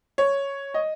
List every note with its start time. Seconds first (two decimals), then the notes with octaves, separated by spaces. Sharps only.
0.18 C#5
0.74 D#5